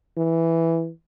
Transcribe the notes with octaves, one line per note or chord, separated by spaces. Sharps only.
E3